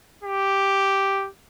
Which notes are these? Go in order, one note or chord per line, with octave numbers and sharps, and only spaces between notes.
G4